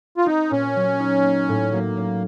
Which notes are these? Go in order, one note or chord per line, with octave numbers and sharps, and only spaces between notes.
F4
C4 D#4
A#2 C#4
F#3
D#4
A#3
A2
F#3 A#3
C#4